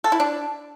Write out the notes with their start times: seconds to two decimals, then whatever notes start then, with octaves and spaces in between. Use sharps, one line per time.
0.04 A4
0.12 E4
0.20 D4